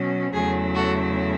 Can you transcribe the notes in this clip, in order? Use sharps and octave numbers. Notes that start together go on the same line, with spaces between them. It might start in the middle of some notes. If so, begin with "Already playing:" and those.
Already playing: B2 F#3 C#4
E2 C#3 F#3 A3 E4 G#4
F#4 A4